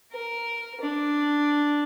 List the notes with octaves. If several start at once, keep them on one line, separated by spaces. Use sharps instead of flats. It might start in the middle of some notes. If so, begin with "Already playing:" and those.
A#4
D4